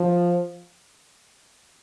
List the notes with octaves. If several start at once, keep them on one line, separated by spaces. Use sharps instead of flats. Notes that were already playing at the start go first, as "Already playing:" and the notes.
Already playing: F3